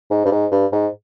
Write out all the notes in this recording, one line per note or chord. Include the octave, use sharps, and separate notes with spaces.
G#2
G2
G#2
G2
G#2